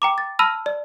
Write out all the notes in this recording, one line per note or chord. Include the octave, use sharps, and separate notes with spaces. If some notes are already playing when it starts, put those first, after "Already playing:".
G5 A#5 D6
A6
A5 B5 E6 F6 A#6
D5